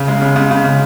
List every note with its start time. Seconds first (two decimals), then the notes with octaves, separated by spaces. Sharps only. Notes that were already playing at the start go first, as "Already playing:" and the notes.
Already playing: C#3
0.08 G#3
0.22 C#3
0.36 C#3
0.51 C#3
0.65 C#3